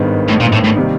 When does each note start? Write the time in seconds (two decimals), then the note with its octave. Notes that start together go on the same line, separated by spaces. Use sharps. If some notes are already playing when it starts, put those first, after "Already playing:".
Already playing: G#1 G2 D#3 G#3 B3
0.28 A2
0.40 A#2
0.52 A2
0.64 A2
0.76 C3 D#3 G3 A#3